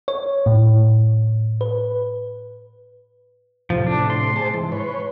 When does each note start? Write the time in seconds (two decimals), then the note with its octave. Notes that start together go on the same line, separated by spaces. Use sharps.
0.08 C#5
0.46 A2
1.61 B4
3.70 A2 C3 F3
3.87 D4
4.10 C6
4.36 G#4 C5 A5
4.54 G#2 E3
4.72 B4 C#5